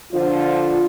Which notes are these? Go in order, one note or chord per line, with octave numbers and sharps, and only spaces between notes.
D3 F3 F4